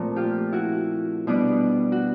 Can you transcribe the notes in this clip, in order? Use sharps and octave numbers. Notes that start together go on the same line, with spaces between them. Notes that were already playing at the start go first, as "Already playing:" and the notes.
Already playing: A#2 F3 A3 C4
F4 G4
E4 F#4
B2 G3 B3 D4
F#4